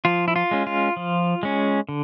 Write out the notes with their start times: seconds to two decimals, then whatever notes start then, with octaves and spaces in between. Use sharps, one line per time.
0.05 F3 F4
0.28 E4
0.36 F4
0.51 G#3 C#4
0.67 F4
0.97 F3
1.43 G#3 C#4
1.89 D3